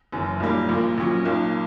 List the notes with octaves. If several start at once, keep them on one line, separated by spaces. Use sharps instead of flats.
F#1 F#2 E3
B1 A#2 G3 A#3
A#1 A#2 A#3
A#1 A#2 F#3 C#4
B1 A#2 A#3